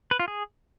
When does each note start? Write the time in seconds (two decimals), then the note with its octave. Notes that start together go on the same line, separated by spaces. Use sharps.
0.11 B4
0.20 F4
0.28 G#4